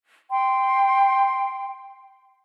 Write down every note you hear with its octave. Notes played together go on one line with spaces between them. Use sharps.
G5 C6